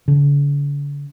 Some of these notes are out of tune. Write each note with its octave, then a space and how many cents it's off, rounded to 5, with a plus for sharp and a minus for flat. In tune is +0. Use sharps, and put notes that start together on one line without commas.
D3 -45